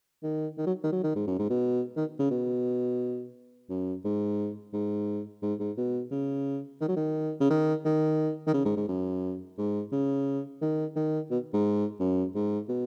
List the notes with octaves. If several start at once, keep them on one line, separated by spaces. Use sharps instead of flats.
D#3
D#3
F#3
D#3
F#3
D#3
G#2
F#2
G#2
B2
D#3
C#3
B2
F#2
G#2
G#2
G#2
G#2
B2
C#3
D#3
F#3
D#3
C#3
D#3
D#3
D#3
C#3
G#2
G#2
F#2
G#2
C#3
D#3
D#3
B2
G#2
F#2
G#2
B2